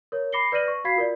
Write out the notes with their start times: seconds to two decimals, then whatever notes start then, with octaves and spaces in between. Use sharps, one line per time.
0.12 A#4 C#5
0.32 B5 D6 A#6 C7 C#7 G7
0.52 B4 D5 F6 A#6 D#7 F#7
0.68 C#6
0.84 F#4 F5 B5 G#6 B6 C7
0.96 F4 A#4 D5